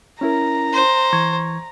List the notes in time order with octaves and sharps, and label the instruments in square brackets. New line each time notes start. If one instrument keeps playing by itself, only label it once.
[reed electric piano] C#4 E4 A#4 [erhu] A#5
[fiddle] C5
[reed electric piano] E3 C#6 G#6